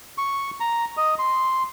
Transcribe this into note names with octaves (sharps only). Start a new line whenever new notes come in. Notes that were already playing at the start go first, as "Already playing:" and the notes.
C#6
A#5
D#5
C6